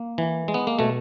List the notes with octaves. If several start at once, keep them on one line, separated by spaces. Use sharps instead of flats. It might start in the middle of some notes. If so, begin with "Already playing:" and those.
Already playing: A#3
E3
G#3
B3
A#3
B2 A3